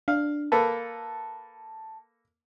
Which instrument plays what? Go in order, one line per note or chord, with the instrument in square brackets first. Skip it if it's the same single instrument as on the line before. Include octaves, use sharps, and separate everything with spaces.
[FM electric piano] D4 [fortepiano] F5
[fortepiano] A#3 A4 B4 [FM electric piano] A5